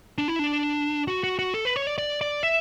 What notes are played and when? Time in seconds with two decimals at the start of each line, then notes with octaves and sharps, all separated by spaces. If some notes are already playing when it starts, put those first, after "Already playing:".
0.18 D4
0.28 E4
0.39 D4
1.08 F#4
1.24 F#4
1.39 F#4
1.54 A4
1.65 B4
1.76 C#5
1.87 D5
1.98 D5
2.21 D5
2.43 E5